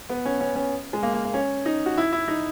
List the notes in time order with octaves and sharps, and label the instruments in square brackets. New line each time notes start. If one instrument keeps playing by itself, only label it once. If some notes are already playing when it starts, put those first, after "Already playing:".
[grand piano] B3
C#4
C#4
C#4
G#3
A#3
A#3
A#3
C#4
D#4
F#4
E4
E4
D#4